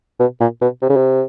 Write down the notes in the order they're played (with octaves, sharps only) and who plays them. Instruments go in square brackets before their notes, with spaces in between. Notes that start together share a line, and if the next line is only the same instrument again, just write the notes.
[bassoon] B2
A#2
B2
C3
C#3
C3